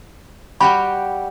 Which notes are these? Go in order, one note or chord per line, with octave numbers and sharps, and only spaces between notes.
G3 F#4 G4 B5